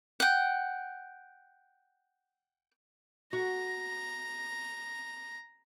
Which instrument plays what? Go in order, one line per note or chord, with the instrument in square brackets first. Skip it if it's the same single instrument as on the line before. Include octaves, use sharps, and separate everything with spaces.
[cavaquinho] F#5 G5
[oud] F#4 [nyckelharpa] A#5